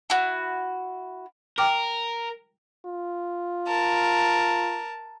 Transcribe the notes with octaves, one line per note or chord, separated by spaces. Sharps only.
E4 F#4
A#4 G5 D6 F6
F4
A#4 A5